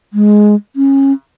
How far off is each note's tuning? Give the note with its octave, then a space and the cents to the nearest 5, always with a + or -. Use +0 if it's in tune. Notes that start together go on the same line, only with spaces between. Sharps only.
G#3 +5
C#4 -20